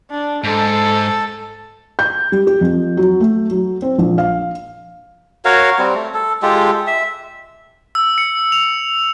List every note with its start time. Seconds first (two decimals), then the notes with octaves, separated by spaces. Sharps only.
0.10 D4
0.44 G#2 A4
1.99 G6
2.32 G3
2.47 G4
2.61 F2
2.97 F#3
3.20 A3
3.51 F#3
3.82 C4
3.99 A#1
4.18 F5
5.45 F#4 A#4 C#5 F5
5.79 G3 C4
5.95 A3
6.14 A4
6.42 G#3 F4 G4 A4
6.87 E5
7.95 E6
8.18 C#7
8.52 F7